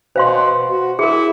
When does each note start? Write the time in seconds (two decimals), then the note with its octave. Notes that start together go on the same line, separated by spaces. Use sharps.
0.16 B2 C5 F5 C6
0.70 F#4
0.99 E4 G#4 A#4